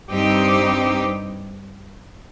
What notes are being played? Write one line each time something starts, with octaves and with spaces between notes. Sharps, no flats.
G2 G3 C4 D#4 G4